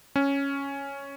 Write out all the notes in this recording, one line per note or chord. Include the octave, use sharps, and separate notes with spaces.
C#4